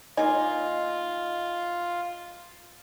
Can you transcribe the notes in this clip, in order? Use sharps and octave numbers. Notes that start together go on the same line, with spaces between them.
A#3 D#4 F4 G#5